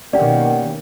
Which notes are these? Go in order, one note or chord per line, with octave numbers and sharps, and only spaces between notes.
B2 D#3 A#3 C#4 G4 D5 F#5